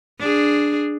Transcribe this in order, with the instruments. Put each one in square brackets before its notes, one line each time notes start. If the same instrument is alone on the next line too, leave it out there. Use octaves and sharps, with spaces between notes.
[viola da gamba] D4 G#4